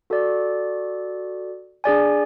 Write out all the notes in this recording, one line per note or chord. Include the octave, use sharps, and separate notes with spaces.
F#4 A4 D5
D4 G#4 D5 G#5